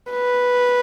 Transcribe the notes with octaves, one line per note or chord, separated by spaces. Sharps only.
B4